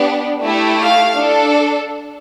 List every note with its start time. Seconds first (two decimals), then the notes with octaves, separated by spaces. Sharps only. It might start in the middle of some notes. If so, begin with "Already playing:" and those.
Already playing: B3 D4 G4
0.42 A3 E4 G4
0.80 F5
1.17 D4 A4